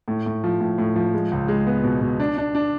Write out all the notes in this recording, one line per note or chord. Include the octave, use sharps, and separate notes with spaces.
A2
A2
F3
A2
A2
F3
G#3
C#2
G#3
B3
B2
B2
D4
D4
D4